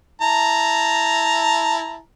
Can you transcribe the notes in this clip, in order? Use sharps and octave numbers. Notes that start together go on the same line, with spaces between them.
E4 A5 A#5